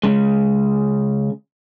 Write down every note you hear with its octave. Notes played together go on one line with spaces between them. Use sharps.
C#3 G#3